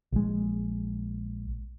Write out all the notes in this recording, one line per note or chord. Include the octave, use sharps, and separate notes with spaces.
A#1 G#3